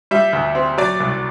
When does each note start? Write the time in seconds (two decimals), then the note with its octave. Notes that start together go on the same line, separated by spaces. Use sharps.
0.11 G3 E5
0.33 D2
0.55 C4
0.78 F#3 D5
1.00 C2